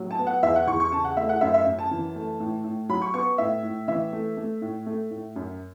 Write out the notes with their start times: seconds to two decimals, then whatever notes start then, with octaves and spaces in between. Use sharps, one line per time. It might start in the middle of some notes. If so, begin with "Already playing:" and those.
Already playing: A2 F#3
0.11 A5
0.18 B3
0.27 F#5
0.43 E2 E5
0.56 F#5
0.67 E2 C#6
0.80 C#6
0.92 C#3 A5
1.04 F#5
1.17 A3 E5
1.29 F#5
1.41 F#2 E5
1.54 E5
1.66 F#2
1.79 A5
1.91 E3
2.15 A3
2.40 A2
2.64 A2
2.89 F#3 B5
3.02 C#6
3.14 B3 C#6
3.38 A2 E5
3.63 A2
3.88 E3 E5
4.12 A3
4.37 A3
4.62 A2
4.86 A3
5.11 A2
5.36 F#2